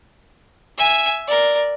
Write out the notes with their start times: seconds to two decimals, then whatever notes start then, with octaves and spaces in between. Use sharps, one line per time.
0.77 E5 G#5
1.28 A#4 D5